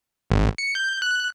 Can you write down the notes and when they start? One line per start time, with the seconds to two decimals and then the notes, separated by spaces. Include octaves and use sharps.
0.30 G#1
0.58 C#7
0.75 G6
1.02 F#6